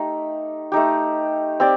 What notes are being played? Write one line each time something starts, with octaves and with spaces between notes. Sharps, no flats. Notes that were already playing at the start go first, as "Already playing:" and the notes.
Already playing: A3 D#4 G4
A3 D#4 G4
C4 G4 D5